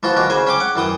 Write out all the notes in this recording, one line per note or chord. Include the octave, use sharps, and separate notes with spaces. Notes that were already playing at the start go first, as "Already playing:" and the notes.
E3 F3 F4 F#4
B2 A#3 F#4
C#3 C5 G#5
C#4 G5 D6
F#5
F#2 E3 G5 D#6